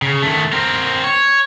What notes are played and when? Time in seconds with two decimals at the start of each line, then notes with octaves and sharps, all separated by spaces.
0.02 C#3
0.23 D#3 A3
0.53 C4 A#4
1.04 C#5